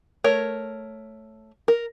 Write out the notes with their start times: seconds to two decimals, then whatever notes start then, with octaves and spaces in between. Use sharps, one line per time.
0.24 A3 A#4 C#5
1.68 A#4